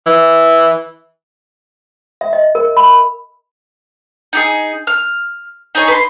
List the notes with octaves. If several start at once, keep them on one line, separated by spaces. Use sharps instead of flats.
E3
E5
D#5
A#4
B5
D#4 G4 G#4
F6
D#4 G#4 C#5
B4 A#5 C6